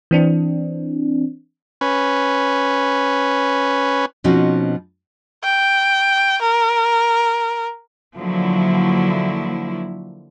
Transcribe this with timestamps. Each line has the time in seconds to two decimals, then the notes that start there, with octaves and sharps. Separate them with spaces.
0.11 E3 C4 D4
1.81 C#4 B4
4.24 B2 F3 C4 C#4 D#4 F#4
5.44 G5
6.42 A#4
8.16 D3 F3 F#3 A#3 E4